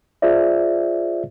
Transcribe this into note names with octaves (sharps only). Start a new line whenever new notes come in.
F4 G#4 C5 D5 E5